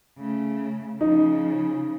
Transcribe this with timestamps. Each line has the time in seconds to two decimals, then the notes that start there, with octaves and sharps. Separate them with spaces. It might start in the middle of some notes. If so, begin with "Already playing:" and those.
0.19 C#3 A3
1.01 C#3 F3 D#4